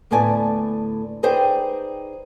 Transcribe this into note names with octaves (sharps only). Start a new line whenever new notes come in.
D2 A2 B3 D5 G#5 A5
D#4 G#4 B4 C5 D5 G5